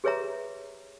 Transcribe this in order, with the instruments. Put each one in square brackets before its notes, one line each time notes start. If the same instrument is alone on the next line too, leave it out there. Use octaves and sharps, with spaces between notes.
[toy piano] G4 G#4 B4 C#5 E5 A#5